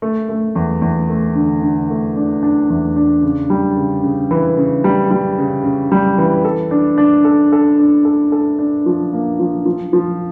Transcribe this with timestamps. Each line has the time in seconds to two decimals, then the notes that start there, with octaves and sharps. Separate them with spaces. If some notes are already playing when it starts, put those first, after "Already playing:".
0.02 A3
0.29 A3
0.55 E2
0.82 E2
1.09 A3
1.35 D3
1.62 D3
1.90 A3
2.16 D4
2.43 D4
2.70 E2
2.96 D4
3.23 C#3
3.50 G3
3.77 C#3
4.03 C#3
4.31 E3
4.57 C#3
4.84 G3
5.11 G3
5.38 C#3
5.64 C#3
5.92 G3
6.18 E3
6.45 A4
6.71 D4
6.98 D4
7.25 A4
7.52 A4
7.79 D4
8.05 A4
8.32 A4
8.59 D4
8.86 F3
9.13 A#3
9.40 F3
9.66 F3
9.93 F3